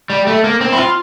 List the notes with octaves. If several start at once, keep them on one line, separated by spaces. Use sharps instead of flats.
G3
A3
A#3
C4
E4
F4